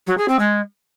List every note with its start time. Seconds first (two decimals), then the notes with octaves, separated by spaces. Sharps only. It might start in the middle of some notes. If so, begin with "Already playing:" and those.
0.07 F#3
0.17 G#4
0.28 C4
0.39 G#3